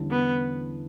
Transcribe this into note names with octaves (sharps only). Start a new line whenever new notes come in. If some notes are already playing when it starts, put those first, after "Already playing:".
Already playing: E2 D3 G3 C#4 E4
B3